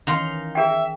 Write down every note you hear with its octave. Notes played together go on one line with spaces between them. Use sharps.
D#3 E3 C#4 D#4 F5 C6
G#4 E5 G5